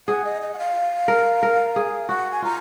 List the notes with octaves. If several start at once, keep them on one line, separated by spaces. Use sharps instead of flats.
G#4 F#5
D#5
D#5
F#5
F5
A#4
A#4
G#4
F#4 F#5
G#5
F4 A#5